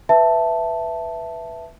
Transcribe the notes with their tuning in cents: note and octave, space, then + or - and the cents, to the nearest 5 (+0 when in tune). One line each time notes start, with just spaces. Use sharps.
B4 +0 E5 +0 A5 +0